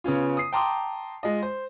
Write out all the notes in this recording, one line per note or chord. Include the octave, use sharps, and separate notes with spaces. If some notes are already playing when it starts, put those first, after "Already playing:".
C#3 B3 C#4 F4
D#6 C7
G5 A5 A#5 C6 D6 D#6
G#3 F4 D#5
C5